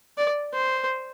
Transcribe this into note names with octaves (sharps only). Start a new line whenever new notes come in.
D5
C5